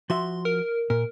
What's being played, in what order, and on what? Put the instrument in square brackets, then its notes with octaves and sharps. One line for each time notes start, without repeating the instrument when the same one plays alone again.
[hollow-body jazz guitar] F3 F#4 E5 [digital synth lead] C6
[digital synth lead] A#4
[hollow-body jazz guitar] A#2 [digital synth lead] A#4